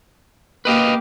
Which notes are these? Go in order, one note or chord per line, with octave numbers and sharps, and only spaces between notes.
A#3 G4 B4 D#5 F5